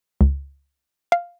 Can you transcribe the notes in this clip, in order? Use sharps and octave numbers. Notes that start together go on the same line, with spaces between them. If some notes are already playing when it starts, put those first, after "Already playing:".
C#2
F5